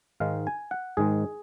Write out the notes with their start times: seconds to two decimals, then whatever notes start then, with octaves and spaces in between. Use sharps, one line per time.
0.20 G#2 D#3 G#3 F5
0.47 G#5
0.71 F#5
0.97 G#2 D#3 G#3 G#4